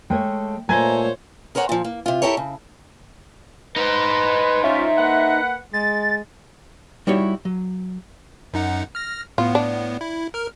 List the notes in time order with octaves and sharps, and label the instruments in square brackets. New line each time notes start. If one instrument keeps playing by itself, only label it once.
[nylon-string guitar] G#3 A3 C#5 [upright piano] G5
[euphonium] A#2 [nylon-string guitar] A3 [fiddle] C5 C#5 [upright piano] G#5 A#5 G#6
[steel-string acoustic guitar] G#4 A#4 C5 C#5 F#5
A#2 F3
A#3
C3 F4
E4 G4 A4 A#4 C#5
C#3
[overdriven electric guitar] D#4 C5 [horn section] B4
[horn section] C#4 F4 [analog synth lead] E5
[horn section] A#3 B4 F#5
[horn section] G#3 [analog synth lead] A6
[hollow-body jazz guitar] G3 D#4 E4 F#4 G4 C#5
F#3
[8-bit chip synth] F#2 D#4 F#5
F6 A#6
[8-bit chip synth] A2 B3 [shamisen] F4
[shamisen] D4
[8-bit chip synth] E4
A#4 F6